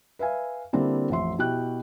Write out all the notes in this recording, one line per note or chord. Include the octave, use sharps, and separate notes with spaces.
B4 E5 F5 G#5
D3 G3 A#3 C4 D4 E4
A1 F2 E5 C6
B2 E4 F#4 G4 G5 F#6